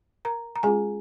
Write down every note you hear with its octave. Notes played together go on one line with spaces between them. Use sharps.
A#4 A#5
A#5
G#3 C#4 F4 G#4 G#5